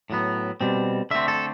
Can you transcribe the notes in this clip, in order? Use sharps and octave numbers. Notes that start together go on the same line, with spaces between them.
A2 F#3 B3
B2 G3 C4
D3 A3 C4 E5
A4